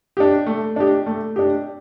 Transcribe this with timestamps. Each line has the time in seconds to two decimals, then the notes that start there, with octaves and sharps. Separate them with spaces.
0.17 D4 G4
0.47 A3
0.76 D4 G4
1.06 A3
1.36 D4 G4